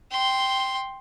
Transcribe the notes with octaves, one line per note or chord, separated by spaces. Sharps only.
G5 C6